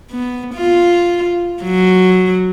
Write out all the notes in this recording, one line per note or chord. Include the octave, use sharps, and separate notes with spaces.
B3
F4
F#3